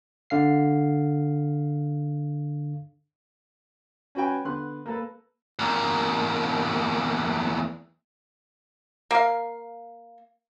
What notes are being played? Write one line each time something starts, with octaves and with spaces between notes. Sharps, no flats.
D3 F5 C7
C#4 F#4 B4 G5 G#5
D3 B3 C6 F#6
A#3 A4 B4
E2 A#3
A#3 F5